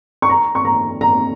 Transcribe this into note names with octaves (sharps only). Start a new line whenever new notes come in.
C#6
A#5
C#6
A#5
A#5